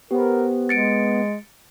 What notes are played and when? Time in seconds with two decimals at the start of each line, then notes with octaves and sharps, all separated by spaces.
0.11 B3 G4 A#4 C5
0.69 G#3 A6 C#7 D7